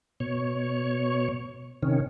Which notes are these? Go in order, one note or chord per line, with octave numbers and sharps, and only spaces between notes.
B2 C#5
C3 D#3 C#4